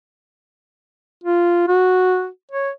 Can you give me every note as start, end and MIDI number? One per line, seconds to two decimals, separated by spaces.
1.24 1.68 65
1.68 2.27 66
2.51 2.70 73